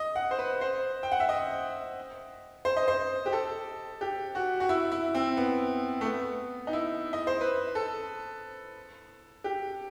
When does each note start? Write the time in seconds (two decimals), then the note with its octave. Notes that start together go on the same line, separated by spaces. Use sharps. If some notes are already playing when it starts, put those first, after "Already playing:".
Already playing: D#5
0.16 F#5
0.31 C5
0.39 B4
0.61 C5
1.03 G5
1.12 F#5
1.20 E5
1.29 D#5
2.65 C5
2.77 D#5
2.88 C5
3.26 G4
3.33 A4
4.01 G4
4.35 F#4
4.60 F#4
4.69 E4
4.91 E4
5.14 C4
5.37 B3
6.01 A3
6.05 B3
6.67 D#4
6.73 E4
7.13 D#5
7.27 C5
7.41 B4
7.75 A4
9.44 G4